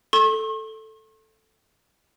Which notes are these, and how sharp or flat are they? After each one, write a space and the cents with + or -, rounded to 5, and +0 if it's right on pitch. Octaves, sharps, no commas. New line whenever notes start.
A4 +0 C#6 -45